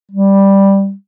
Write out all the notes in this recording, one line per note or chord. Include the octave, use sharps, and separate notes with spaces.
G3